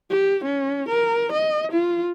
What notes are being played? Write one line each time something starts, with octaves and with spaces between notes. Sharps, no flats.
G4
C#4
A#4
D#5
F4